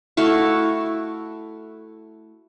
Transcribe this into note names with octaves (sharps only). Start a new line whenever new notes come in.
A3 E4 F#4 F5